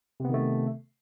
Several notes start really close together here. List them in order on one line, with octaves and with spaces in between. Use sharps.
C3 B3 D#3 A3